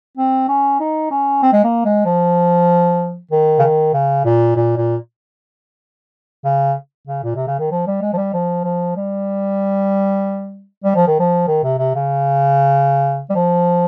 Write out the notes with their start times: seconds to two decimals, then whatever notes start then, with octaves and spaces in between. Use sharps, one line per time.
0.17 C4
0.48 C#4
0.80 D#4
1.11 C#4
1.42 C4
1.53 G#3
1.64 A#3
1.85 G#3
2.05 F3
3.31 D#3
3.59 C#3
3.62 D#3
3.94 C#3
4.25 A#2
4.56 A#2
4.77 A#2
6.45 C#3
7.07 C#3
7.24 A#2
7.35 C3
7.47 C#3
7.59 D#3
7.71 F3
7.87 G3
8.02 G#3
8.13 F3
8.17 G3
8.33 F3
8.64 F3
8.97 G3
10.84 G3
10.95 F3
11.08 D#3
11.20 F3
11.47 D#3
11.64 C3
11.78 C3
11.95 C#3
13.30 G3
13.35 F3